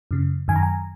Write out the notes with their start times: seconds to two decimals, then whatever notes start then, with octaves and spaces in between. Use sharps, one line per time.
0.11 F#2 C#3
0.48 F#2 D#3 G#5
0.56 A#5
0.63 G#5